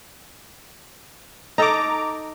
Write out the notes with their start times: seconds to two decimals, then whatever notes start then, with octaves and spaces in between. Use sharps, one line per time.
1.58 D#4 A4 A#5 D6